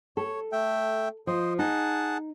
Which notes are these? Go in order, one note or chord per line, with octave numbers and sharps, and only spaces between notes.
A4 C#5
A3 E5 G5
F3 C5 D#5
D#4 G#4 F#5 A5